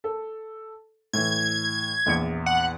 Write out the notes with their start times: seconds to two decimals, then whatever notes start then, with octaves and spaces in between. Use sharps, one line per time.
0.04 A4
1.13 A2 E3 G#6
2.06 A#1 E2 C#7
2.46 F#5